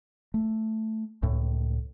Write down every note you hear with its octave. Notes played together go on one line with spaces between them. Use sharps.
A3
C#2 A2